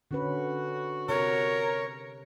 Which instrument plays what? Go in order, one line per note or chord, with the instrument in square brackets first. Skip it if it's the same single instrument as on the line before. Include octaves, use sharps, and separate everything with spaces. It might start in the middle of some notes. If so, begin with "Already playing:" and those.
[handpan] D3 C#4 B4 [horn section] F#4
[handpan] C3 [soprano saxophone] A#4 [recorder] C#5